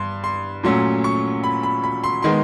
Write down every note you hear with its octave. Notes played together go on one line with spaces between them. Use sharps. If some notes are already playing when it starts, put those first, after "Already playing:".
Already playing: G2 C6
C6
A#2 F#3 A3 C#4 C6
C#6
B5
B5
B5
C6
D#3 G#3 B3 C6